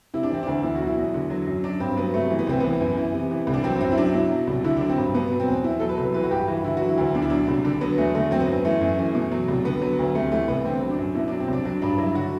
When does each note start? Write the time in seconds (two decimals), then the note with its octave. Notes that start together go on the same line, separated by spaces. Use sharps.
0.14 C3 E4
0.23 D4
0.30 E3 C4
0.43 D2 D4
0.63 B2 E4
0.75 F#4
0.80 F#3
0.87 E4
0.97 E2
1.14 D3
1.30 F#3
1.47 F#2
1.64 F#3 D4
1.80 G2 C4
1.97 F#3 B3
2.14 C3 A3
2.31 E3
2.39 B3
2.47 C2 C4
2.60 E3 B3
2.81 F#2
2.97 E3
3.14 C3
3.31 E3
3.47 C2
3.54 D4
3.64 F#3 C4
3.81 F#2 C4
3.92 E4
3.97 F#3 D4
4.14 B2 E4
4.31 F#3
4.47 C2
4.64 D3 E4
4.77 D4
4.81 F#3
4.89 C4
4.97 G2
5.14 B2 B3
5.31 F#3
5.40 C4
5.48 E2
5.64 B2 E4
5.80 F#3 A4
5.89 B4
5.98 C2
6.14 E3 B4
6.23 F#4
6.31 G2 G4
6.48 E3 F#4
6.64 D3 E4
6.77 F#3 F#4
6.89 E4
6.98 D2
7.15 B2 D4
7.22 E4
7.30 F#3 D4
7.48 C2
7.65 D3 D4
7.81 F#3 B3
7.98 E2 A3
8.14 D3 A3
8.31 F#3 C4
8.40 B3
8.48 F#2
8.65 E3 A3
8.81 F#2
8.99 E3
9.15 B2
9.32 F#3
9.48 C2
9.65 D3 B3
9.82 F#3
9.99 D2
10.15 C3 A3
10.32 E3 A3
10.48 C2 B3
10.65 D3 C4
10.82 F#3
10.90 D4
10.99 F#2
11.15 B2 E4
11.28 D4
11.32 F#3
11.40 C4
11.48 C2 D4
11.65 F#3 D4
11.82 G2 D4
11.98 F#3 E4
12.15 D3 F#4